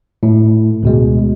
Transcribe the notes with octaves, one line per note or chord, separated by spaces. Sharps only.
A2
D2 B2 G#3